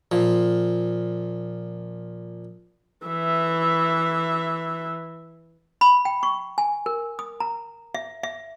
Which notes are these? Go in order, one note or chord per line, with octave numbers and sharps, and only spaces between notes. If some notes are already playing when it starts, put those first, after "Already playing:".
A#2 F3
E3 E5
B5
G5
C#6
G#5
A#4
D#6
A#5
E5
E5